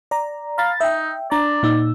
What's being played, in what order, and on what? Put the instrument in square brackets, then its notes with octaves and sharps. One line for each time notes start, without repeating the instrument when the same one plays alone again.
[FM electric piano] D5 A#5
[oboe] F5 [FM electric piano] A#5 B5 A6
[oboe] D#4 [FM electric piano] E5 G5
[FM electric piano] D4 A#5 [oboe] D5
[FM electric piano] A#2 D#4 E6